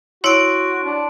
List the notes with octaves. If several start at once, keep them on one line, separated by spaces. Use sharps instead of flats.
E4 F#4 C#5 C6 D7
D4